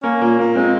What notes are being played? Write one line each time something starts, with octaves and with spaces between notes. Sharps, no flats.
A#3 C#4
A#2 A#3
A#2 A#3
G#3 C4